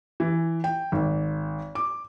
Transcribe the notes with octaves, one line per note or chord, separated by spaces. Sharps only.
E3
G5
G#1
D6